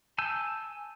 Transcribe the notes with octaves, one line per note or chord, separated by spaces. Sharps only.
G#5 A5 E6 G6